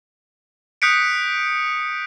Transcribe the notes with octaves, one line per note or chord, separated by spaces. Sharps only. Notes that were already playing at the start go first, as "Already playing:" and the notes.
D#6 F#6 G6 B6 C#7 D7